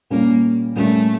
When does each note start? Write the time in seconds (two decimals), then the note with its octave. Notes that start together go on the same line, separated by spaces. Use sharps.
0.10 A#2 G3 A#3 C#4
0.75 A#2 G3 A3 C#4